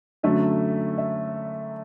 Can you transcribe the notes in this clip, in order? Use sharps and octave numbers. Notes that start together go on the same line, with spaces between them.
F#2 D3 F#3 A3 E5
E5